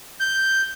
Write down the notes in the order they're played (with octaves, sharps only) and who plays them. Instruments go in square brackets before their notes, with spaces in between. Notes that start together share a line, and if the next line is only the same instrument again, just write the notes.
[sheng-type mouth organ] G6